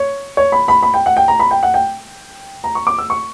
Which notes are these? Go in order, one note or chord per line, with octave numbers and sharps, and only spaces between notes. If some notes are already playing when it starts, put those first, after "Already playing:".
Already playing: C#5
C#5
B5
B5
B5
G5
F#5
G5
A#5
B5
G5
F#5
G5
A#5
C#6
D6
E6
C#6